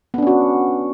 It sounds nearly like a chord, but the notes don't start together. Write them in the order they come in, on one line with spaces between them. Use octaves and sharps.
B3 D4 C#4 F#4